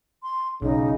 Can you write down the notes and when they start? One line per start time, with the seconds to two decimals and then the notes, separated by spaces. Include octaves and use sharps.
0.23 C6
0.62 B1 C#3 D#4